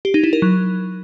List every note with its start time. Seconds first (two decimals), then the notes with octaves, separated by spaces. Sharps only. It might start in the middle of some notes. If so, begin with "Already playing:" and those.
0.05 G4
0.14 D#4
0.24 E4
0.33 A#4
0.42 F#3